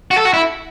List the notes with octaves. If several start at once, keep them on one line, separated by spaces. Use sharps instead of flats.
F#4
A4
F#4
E4